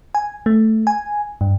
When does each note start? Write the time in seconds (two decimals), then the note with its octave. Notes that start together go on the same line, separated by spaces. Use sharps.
0.15 G#5
0.46 A3
0.87 G#5
1.41 G2